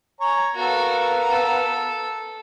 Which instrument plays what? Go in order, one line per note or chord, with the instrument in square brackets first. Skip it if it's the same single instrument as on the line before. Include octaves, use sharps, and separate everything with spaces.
[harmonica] C#5 G#5 A#5
[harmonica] B3 A#4 F5 [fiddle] F#4 A4
[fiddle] A4